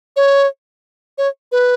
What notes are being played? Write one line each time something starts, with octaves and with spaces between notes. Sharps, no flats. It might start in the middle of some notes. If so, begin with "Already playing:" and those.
C#5
C#5
B4